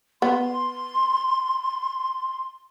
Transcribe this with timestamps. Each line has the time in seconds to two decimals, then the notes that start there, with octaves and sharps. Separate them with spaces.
0.22 B3 C6